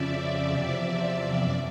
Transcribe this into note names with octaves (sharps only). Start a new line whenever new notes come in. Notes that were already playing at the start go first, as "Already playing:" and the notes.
Already playing: F2 C#3 F3 D5 E5
E2 C3 F3
F#2